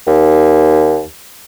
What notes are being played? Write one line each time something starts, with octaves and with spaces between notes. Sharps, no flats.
D#2